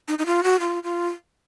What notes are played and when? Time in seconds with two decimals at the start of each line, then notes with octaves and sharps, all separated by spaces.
0.08 D#4
0.19 D#4
0.26 F4
0.43 F#4
0.60 F4
0.83 F4